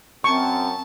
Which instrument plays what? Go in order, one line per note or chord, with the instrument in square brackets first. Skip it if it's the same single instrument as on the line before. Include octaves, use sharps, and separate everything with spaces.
[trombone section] F#2 [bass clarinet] C4 [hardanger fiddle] A5 [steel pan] C#6